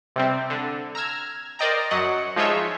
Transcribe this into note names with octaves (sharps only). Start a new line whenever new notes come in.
C3 G3 C4
D3
A#5 E6 F6 G#6
A#4 C5 D5 D#5 G5 A#5
F#2 F#3 D#5 F#5
F3 G#3 D#4 F4 C#5 E5